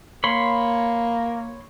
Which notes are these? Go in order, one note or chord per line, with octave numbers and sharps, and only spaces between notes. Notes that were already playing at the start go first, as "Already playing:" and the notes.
A#3 C#5 B5 C6